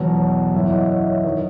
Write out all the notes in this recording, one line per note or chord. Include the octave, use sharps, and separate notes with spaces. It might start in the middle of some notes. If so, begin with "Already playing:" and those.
Already playing: E2 B2 F#3
F#2 E3 C#5 E5
D#5 F#5
C#5 E5
C#5 E5
D#3 F#3 B4 D#5